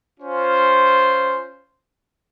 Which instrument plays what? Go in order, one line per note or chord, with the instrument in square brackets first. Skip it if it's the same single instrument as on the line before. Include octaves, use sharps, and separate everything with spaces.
[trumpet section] C#4 F4 C5